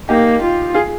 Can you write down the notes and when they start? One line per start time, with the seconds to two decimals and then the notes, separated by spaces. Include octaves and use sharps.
0.09 A#3 D#4 G4
0.42 F4
0.74 F4 G#4